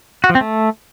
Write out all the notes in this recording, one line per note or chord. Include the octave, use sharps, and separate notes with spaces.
F#4
F3
C4
A3